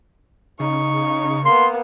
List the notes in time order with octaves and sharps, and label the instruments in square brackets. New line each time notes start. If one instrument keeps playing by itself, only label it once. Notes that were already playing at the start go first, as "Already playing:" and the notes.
[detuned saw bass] C#3 [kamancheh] D#4 C#6
[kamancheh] A#3 B3 [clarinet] C6